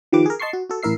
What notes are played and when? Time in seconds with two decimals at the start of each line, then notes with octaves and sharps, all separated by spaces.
0.13 D#3 F3 G4 B4 D6
0.26 G#4 A#4
0.40 D#5 A5 C6 C#6 C7
0.53 F#4
0.69 F#4 A4
0.83 A1 E4 A#4 E5 C7